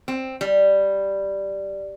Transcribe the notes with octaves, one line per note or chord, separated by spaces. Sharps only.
C4
G3